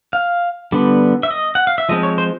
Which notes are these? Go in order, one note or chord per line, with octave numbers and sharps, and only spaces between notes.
F5
D3 G3 B3
E5
D#5
F#5
F5
E5
F3 G#3 C4 D#5
C#5
C5